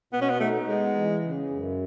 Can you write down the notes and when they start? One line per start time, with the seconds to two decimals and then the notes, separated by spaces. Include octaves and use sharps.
0.13 B2 B3
0.21 C#4
0.30 B3
0.40 A3 D#4
0.68 G#3 B3
0.95 E3
1.22 C#3
1.50 F#2